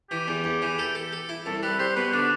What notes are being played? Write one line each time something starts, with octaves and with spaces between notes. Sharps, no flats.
E3 G4
E2
E2
E3
A4
A4
A4
E4
C2 A4
G3 B4
G3 C5
B2 B4
D3 D4